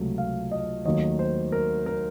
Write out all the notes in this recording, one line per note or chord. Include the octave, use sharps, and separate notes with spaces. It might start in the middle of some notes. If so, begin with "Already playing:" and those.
Already playing: C#2 C3 F#3 A3
F5
D#5
D#2 D#3 F#3 A3 D#5
C5
A#4
A#4